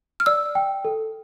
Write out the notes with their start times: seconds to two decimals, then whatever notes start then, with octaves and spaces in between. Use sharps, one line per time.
0.20 F6
0.26 D5 E6
0.55 G5
0.85 A4